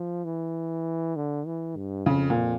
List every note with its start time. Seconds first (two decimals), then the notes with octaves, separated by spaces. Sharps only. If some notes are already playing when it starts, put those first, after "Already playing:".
Already playing: F3
0.24 E3
1.16 D3
1.46 E3
1.76 G2
2.06 F2 C#3
2.30 A#2